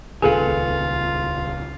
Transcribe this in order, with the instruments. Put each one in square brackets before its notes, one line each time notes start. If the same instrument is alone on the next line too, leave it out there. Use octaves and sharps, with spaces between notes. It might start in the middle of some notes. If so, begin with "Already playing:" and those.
[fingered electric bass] D#1 C#2 [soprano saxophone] F4 [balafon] G#4 F5 [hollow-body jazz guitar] A4 B4 G#5